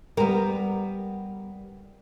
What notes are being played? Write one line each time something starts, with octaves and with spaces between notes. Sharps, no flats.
G3 B3 A#4